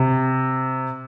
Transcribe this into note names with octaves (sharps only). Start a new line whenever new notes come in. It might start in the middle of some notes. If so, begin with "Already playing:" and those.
Already playing: C3